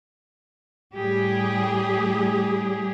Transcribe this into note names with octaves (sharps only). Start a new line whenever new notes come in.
A2 G3 G4 G#4